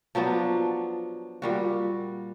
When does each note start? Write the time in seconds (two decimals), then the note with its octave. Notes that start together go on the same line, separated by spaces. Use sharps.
0.15 F3 F#3 B3 D4
1.42 A#2 G3 F#4